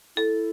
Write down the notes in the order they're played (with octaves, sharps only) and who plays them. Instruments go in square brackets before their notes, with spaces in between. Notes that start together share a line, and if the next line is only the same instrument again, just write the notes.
[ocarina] E4 [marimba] A4